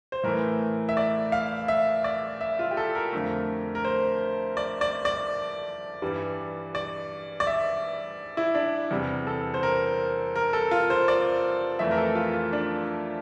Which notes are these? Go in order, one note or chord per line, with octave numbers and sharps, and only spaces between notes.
C5
A2 E3 A3 A#4
E5
D5
F5
E5
D5
E5
F4
G4
A4
A#4
F2 D3 A3
A#4
C5
D5
D5
D5
G2 E3 G3
D5
D5
E5
E4
D4
E2 C3 G3
A4
C5
A#4
A#4
A4
F4
C5
D5
F2 E3 A3 E5
A#4
A4
F4
F4
D4